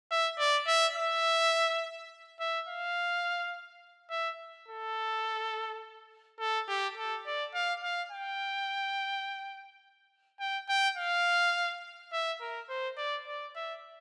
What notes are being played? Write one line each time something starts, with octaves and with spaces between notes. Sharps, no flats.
E5
D5
E5
E5
E5
F5
E5
A4
A4
G4
A4
D5
F5
F5
G5
G5
G5
F5
E5
A#4
C5
D5
D5
E5